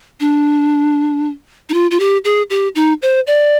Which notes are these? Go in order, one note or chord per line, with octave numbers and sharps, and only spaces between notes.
D4
D#4
F4
F4
G4
G#4
G4
D#4
C5
D5